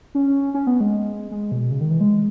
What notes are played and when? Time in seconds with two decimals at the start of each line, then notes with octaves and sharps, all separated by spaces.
0.15 C#4
0.54 C#4
0.67 B3
0.81 G#3
1.31 G#3
1.52 B2
1.71 C#3
1.81 D#3
1.90 E3
2.01 G#3